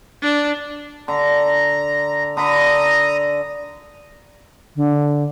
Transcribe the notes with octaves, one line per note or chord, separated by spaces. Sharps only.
D4
D3 A#5
D3 A#5 B5 D#6
D3